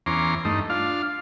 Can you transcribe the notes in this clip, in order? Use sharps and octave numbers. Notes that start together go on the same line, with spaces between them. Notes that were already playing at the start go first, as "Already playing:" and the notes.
E2 C#4 A#5 C6 D6
G2 A3 D#4
D4 F4 F5